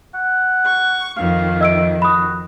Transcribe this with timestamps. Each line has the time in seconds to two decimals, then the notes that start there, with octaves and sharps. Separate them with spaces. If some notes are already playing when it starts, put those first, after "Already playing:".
0.14 F#5
0.65 C#6
1.17 F2 D#3 F5
1.61 D#5 E5 E6 D7
2.02 F#4 B5 D#6